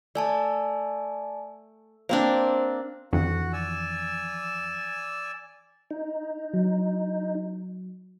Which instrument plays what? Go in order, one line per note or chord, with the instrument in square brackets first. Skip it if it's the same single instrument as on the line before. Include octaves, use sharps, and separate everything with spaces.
[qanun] A3 [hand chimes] D5 G#5 A5
[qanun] A#3 C4 D4 [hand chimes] C5
[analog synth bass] F2 [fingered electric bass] D#3 E3 D4 [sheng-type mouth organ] F#4 F#5
[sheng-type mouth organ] D5 G#5 E6
[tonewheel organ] D#4
[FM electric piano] F#3